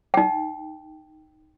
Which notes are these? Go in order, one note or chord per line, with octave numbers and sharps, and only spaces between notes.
D#4 G5